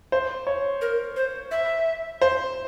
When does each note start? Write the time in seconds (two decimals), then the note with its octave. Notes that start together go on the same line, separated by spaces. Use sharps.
0.12 C5
0.47 C#5
0.81 A#4
1.16 C5
1.51 E5
2.22 C5